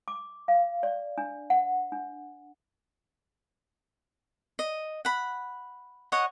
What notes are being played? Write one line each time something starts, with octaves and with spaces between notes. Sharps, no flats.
D6
F5
D5
D4
F#5
D4
D#5
F#5 B5
C#5 D#5 F#5